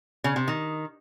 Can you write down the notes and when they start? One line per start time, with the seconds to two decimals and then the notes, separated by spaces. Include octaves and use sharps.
0.24 C#3
0.36 C3
0.48 D#3